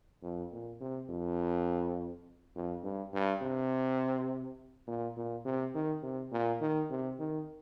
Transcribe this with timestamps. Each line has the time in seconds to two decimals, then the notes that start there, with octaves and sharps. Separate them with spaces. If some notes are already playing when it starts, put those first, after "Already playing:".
0.22 F2
0.52 A#2
0.81 C3
1.09 F2
2.55 F2
2.83 G2
3.13 G2
3.42 C3
4.87 A#2
5.16 A#2
5.45 C3
5.74 D#3
6.03 C3
6.32 A#2
6.61 D#3
6.90 C3
7.19 D#3